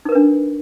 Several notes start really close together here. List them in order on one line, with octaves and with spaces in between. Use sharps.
D#4 A#4 B4 D4